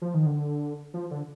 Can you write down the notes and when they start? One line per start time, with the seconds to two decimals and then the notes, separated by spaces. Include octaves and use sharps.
0.02 F3
0.14 D#3
0.26 D3
0.94 F3
1.11 D3